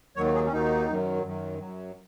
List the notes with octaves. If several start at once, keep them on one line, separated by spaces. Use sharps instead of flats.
D#2 D#3 F#3 C#5
G#4
C#4
D#2 D#3 F#3 D#4
F#2 D#3 F#3
F#2 D#3 F#3
F#2 F#3